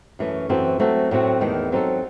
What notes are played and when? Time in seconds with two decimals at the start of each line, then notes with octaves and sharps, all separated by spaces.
0.19 F#2 E3 A3 C#4
0.49 F#2 E3 C4 F#4 A4
0.80 F#3 A3 C4 F#4 A4
1.11 A2 F#3 A3 C4 F#4
1.41 E2 D#3 A3
1.72 F#3 C4 D#4 A4